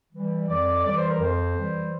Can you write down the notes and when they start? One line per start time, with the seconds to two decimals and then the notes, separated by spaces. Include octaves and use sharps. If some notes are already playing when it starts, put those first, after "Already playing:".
0.13 E3 G3
0.48 F2 D5
0.84 E3 G3 D5
0.98 C5
1.10 A#4
1.19 F2 C5
1.55 E3 G3